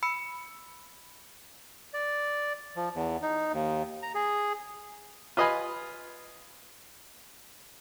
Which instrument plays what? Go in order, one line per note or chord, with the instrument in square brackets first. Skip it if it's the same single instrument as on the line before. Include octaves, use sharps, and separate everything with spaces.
[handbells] B5 E6 C#7
[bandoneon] D5
F3
E2
D#4
D#2
A#5
G#4
[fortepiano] F4 B4 D#5 F5 G#5 B5